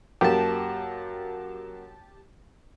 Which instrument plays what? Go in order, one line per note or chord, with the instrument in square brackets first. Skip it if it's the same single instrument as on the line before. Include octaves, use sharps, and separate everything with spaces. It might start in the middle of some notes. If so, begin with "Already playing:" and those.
[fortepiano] F#2 A#3 [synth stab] G4 A5